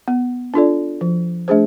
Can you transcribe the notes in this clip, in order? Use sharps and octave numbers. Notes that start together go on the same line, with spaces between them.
B3
D4 F4 A4 D5
F3
A3 D4 G#4 C5